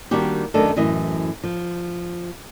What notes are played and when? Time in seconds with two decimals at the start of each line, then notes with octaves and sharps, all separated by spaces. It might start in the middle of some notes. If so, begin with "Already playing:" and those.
0.11 D#3 G3 A#3 D4 F#4 G4
0.54 F#2 D#3 A3 D4 A4
0.76 F#2 A2 E3 D#5
1.44 F3